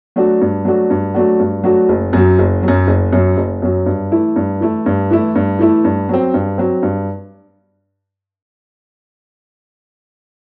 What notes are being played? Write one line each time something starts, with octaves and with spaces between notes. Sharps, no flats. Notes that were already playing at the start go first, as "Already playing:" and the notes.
F#3 A3 D4 F#4
G2
F#3 A3 D4 F#4
G2
F#3 A3 D4 F#4
G2
F#3 A3 D4 F#4
F#1
F#2 F#3
F#1
F#3
F#2
F#1
F#2 F#3
F#1
F#2 F#3
G2
E3 A3 E4
G2
E3 A3 E4
G2
E3 A3 E4
G2
E3 A3 E4
G2
F#3 C4
G2
F#3 C4
G2